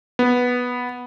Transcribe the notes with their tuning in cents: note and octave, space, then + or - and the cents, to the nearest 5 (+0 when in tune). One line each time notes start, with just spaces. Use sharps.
B3 -5